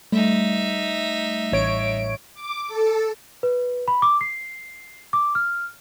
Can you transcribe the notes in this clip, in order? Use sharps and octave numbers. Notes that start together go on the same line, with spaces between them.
G3 A3 D#4 E5
A1 C#5 D7
D6
A4
B4
B5
D6
C7
D6
F6